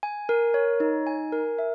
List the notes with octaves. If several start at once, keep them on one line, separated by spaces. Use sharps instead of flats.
G#5
A#4
C#5
D#4
G#5
A#4
E5